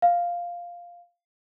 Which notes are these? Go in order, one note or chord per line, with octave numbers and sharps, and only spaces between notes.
F5